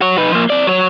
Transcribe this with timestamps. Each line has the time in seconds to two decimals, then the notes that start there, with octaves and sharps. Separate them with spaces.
0.01 F#4 C#5
0.18 D#4 B4
0.32 F3 A#3
0.50 C4 D5
0.67 F#3 C#5